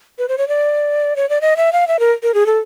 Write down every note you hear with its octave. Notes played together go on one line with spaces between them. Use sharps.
B4
C5
C#5
D5
C#5
D5
D#5
E5
F5
E5
A#4
A#4
G#4
A4